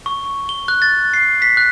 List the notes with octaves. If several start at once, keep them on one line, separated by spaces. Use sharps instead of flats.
C#6
G7
F#6
A6
C7
B6
F#6